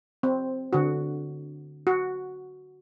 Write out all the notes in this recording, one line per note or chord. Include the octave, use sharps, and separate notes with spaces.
C4
D3 F#4
F#4